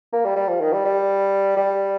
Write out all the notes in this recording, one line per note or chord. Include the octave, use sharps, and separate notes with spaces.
A#3
G3
G3
F3
D#3
G3
G3
G3